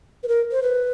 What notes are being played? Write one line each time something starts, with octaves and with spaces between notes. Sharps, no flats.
B4
A#4
C5
B4